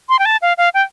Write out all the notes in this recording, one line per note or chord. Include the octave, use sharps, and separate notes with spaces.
C6
G5
A5
F5
F5
G5